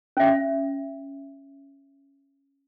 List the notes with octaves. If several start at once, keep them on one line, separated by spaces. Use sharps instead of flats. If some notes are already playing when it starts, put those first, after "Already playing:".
C#4 E5